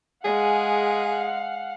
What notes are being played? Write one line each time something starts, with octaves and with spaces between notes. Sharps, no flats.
G#3 G#4 F5 F#5